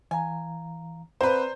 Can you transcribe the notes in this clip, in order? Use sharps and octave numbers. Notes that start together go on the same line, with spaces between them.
E3 F5 G#5 A#5
A#3 C4 B4 C5 D5 A#5 C6